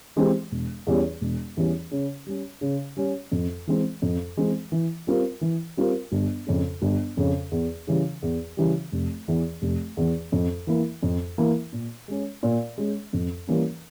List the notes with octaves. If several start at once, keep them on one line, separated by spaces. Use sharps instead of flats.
E3 G#3 C4 G4
E1
E2 E3 G3 C#4
E1
E2 E3 G3 C#4
C#3
G3 C#4
C#3
G3 C#4
F2
E3 G#3 C4
F2
E3 G#3 C4
E3
G3 C4 F4 A#4
E3
G3 C4 F4 A#4
G1
F2 C#3
G1
F2 C#3
E2
C#3 E3 G3
E2
C#3 E3 G3
F1
E2 E3
F1
E2 E3
F2
E3 A#3 E4
F2
E3 A#3 E4
A#2
G#3 C#4
A#2
G#3 C#4
F2
E3 G3 A#3 C#4